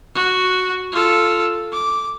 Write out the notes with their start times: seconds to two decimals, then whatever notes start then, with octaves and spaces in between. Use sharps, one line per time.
0.15 F#4
0.92 F4 A4
1.72 D6